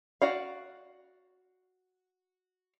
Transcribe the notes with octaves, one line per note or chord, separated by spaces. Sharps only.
F#4 D5 F5